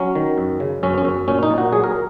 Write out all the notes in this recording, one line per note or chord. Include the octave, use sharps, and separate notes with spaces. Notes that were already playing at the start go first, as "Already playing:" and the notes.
Already playing: F#3 C#4
D#3
F#2
C#3
F#2 C#4
C#4
F#2
A#2 C#4
D#4
A#2
F#4
F#3 G#4
A#4